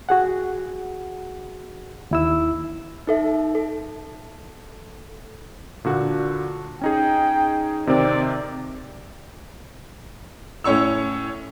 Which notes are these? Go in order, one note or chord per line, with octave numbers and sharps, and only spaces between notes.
F#4 G#4 F#5
D#2 E4 E6
D#4 A4 E5
A4
A#2 D3 F#4
C#4 D#4 G#4 G5
C3 D#3 C4 D5
A2 C#4 C#5 C#6 E6